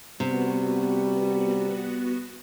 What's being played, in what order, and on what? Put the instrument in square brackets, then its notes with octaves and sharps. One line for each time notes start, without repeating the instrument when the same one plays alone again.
[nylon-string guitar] C3 [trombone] G3 [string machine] B3 F#4